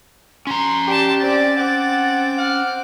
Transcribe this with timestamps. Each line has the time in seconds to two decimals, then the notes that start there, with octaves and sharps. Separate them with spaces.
0.47 C#4 A#5 C6
0.88 G4 D5 A5
1.19 C4 D5 A6
1.57 C4 F#5 D6
2.38 F#5 F6